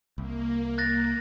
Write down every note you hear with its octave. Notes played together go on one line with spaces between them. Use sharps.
C2 A#3
F#6 A6 A#6